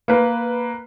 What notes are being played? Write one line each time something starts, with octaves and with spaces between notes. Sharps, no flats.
A#3 B4